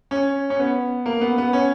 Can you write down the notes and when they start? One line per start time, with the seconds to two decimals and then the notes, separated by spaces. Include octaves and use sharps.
0.11 C#4
0.50 C#4
0.59 B3
1.06 A#3
1.21 B3
1.38 B3
1.53 C#4